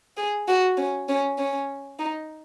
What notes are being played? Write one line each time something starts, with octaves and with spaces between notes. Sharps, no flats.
G#4
F#4
C#4
C#4
C#4
D#4